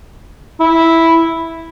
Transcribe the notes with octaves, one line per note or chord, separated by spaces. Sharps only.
E4